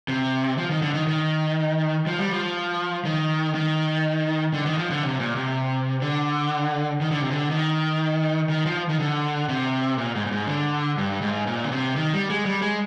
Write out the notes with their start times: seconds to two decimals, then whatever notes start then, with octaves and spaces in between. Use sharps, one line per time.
0.08 C3
0.58 F3
0.70 D#3
0.82 D3
0.94 D#3
1.07 D#3
2.07 F3
2.18 G3
2.31 F3
3.05 D#3
3.55 D#3
4.53 D3
4.66 D#3
4.78 F3
4.91 D3
5.03 C3
5.20 A#2
5.36 C3
6.02 D3
7.01 D#3
7.11 D3
7.21 C3
7.30 D3
7.50 D#3
8.50 D#3
8.66 F3
8.89 D#3
9.00 D3
9.49 C3
9.98 A#2
10.15 G#2
10.26 A#2
10.31 G#2
10.47 D3
10.98 G2
11.22 G#2
11.47 A#2
11.64 D3
11.72 C3
11.96 D#3
12.13 G3
12.30 G#3
12.46 G3
12.62 G#3